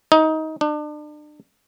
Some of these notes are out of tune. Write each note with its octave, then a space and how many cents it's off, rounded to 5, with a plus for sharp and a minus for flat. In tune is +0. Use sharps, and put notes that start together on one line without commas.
D#4 +20
D4 +35